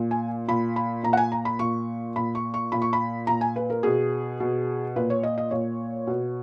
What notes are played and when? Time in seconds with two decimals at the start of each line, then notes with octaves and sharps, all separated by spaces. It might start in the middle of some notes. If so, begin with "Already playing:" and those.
Already playing: A#2
0.11 G#5
0.48 A#2 B5
0.76 B5
1.03 A#2 A#5
1.13 F#5
1.17 G#5
1.32 A#5
1.45 B5
1.59 A#2 C#6
2.16 A#2 B5
2.35 C#6
2.54 C#6
2.72 A#2 B5
2.82 C#6
2.93 B5
3.27 A#2 A#5
3.41 G#5
3.56 B4
3.70 A#4
3.83 B2 G#4
4.40 B2
4.96 A#2 B4
5.10 C#5
5.23 D#5
5.38 D#5
5.51 A#2 C#5
6.07 B2